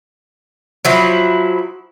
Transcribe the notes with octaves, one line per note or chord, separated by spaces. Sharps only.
F3 F#3 E4